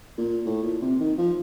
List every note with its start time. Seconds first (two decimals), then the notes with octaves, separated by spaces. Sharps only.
0.18 A#2
0.46 A2
0.63 A#2
0.82 C3
0.99 D#3
1.18 F3